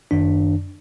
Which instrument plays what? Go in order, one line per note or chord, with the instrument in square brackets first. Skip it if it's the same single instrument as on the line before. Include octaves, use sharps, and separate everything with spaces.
[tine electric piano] F#2 D#3 D4